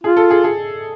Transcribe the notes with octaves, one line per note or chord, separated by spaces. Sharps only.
F4 G#4
A4
G#4
G#4